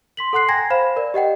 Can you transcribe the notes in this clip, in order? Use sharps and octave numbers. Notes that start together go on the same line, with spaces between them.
C6 B6 F#7
A4 F#5 C6 F#6 C7
G5 G#5 A#5 G#6 A#6
C5 F5 B5 E7
A#4 D5
G4 D#5 F#5 G5